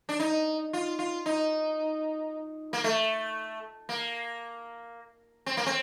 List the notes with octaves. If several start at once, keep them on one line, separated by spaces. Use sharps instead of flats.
D4
D#4
F4
F4
D#4
A#3
A3
A#3
C4
A#3
C4